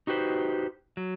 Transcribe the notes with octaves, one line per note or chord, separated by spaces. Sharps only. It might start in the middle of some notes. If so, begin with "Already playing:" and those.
D#4 F#4 G4 B4 C5
F#3